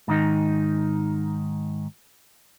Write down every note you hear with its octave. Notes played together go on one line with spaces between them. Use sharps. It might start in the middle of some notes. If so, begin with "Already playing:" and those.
G#2 D#3 D#4